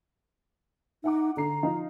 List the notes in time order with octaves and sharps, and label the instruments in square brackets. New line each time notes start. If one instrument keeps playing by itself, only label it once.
[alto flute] D#4 [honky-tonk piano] E5 F#5 D6
[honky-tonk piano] D3 C7 [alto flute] A#5
[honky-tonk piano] F3 D#4 F4